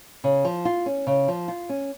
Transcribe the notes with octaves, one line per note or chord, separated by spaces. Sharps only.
C#3
F3
F4
C#4
C#3
F3
F4
C#4